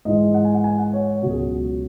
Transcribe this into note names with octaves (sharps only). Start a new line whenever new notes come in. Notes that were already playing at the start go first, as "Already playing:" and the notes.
G#2 E3 G#3 D#5
F#5
G#5
F#5
G#5
F#5
C#5
C#2 B2 F#3 F#4
G#4
F#4